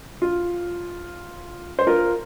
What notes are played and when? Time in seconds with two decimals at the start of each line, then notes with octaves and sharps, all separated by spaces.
0.22 F4
1.79 C5
1.87 F4 A#4